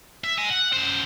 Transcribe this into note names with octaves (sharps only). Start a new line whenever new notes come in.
E5
D#5 G#5
F#5
F#2 C5